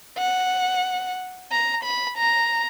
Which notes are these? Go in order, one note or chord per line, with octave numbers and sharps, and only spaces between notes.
F#5
A#5
B5
A#5